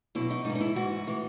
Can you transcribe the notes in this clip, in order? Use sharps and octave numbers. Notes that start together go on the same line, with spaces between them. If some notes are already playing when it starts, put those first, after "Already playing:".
E2 B2 F#3 E4
D#4
G#2 E3 D#4
D#4
E4
G#2 E3 F#4
A2 E3